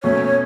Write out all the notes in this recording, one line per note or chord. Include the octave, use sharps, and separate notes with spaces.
B2 F#3 A3 C#4 C#5